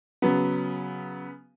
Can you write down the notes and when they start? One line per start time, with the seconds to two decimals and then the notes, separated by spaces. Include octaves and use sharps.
0.22 C#3 F#3 B3